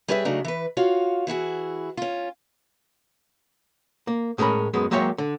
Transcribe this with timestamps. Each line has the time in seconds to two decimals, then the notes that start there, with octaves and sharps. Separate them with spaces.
0.08 G3 C#4 G#4 B4 C#5 E5
0.25 C#3 F#3 A3 D4 D#4
0.44 E3 B4
0.77 F4 F#4 C#5 F5
1.27 E3 E4 F#4 G#4
1.97 C#4 F4
4.07 A#3
4.38 A2 G#3 A3 C#4 A#4 B5
4.74 F#2 G#3 B3
4.91 F#3 G#3 A#3 G4 C#5 E5
5.18 D3